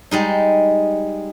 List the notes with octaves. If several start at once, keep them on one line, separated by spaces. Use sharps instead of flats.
G3 G#3 D#4